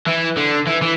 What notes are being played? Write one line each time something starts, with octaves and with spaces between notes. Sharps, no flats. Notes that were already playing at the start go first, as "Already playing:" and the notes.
E3
D3
E3
E3